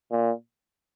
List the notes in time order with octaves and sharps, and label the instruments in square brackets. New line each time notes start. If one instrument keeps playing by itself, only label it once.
[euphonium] A#2